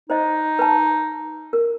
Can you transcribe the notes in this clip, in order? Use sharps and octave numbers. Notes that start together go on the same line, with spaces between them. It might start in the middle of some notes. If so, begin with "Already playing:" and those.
D#4 C5 D#5
B4 A5
A#4